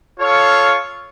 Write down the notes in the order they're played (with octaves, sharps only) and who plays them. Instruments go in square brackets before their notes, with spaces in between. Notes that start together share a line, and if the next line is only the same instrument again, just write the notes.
[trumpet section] F4 A4 C#5 F5